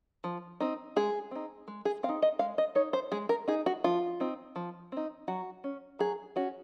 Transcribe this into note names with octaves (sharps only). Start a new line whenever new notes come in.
F3
C4 D#4
G#3 G#4
C4 D#4
G#3
G#4
C4 F5
D#4
D#5
G#3 F5
D#5
D#4 C#5
C5
G#3 G#4
A#4
D#4 G#4
F#4
F3 F4
C4 D#4
F3
C4 D#4
F#3 F#4
C#4
F#3 G#4
C#4 F#4